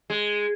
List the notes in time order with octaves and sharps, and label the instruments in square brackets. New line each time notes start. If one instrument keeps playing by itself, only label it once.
[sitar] G#3